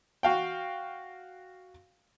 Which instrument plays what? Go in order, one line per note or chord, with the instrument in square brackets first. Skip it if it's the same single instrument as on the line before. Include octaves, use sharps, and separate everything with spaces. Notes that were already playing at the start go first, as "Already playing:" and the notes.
[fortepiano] F#4 F5 G5